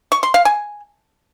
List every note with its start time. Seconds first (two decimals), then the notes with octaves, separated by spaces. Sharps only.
0.12 C#6
0.23 C6
0.34 F5
0.45 G#5